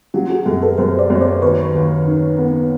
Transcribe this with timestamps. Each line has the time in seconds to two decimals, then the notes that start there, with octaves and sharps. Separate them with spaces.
0.14 F#3 F4 G4
0.30 F#4 G#4
0.46 F#2 G4 A4
0.62 A4 B4
0.77 F#2 A#4 C5
0.99 C5 D5
1.10 F#2
1.15 C#5
1.21 C5 D5
1.42 D#2 B4 C#5
1.74 D#2
2.07 D#3
2.39 B3